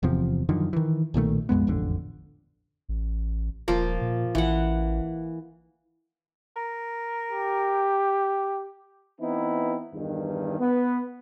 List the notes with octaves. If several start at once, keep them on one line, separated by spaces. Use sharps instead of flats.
D1 E2 C3 F3
F#2 D3 D#3 F3
D#3 E3
B1 A#2 D#3 A3
A#1 F2 G#3 B3
E1 A1 F2 D3
A1
D#1 F3 A#3
A#2
A1 E3 F#5
A#4
G4
E3 B3 C4 D#4 E4
E2 G2 D#3
B3